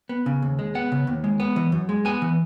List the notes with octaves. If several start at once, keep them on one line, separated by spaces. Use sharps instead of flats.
B3
C#3
D#2
G#3
B3 F#5
C#3
D#2
G#3
B3
E3
F#2
G#3
B3 G#5
E3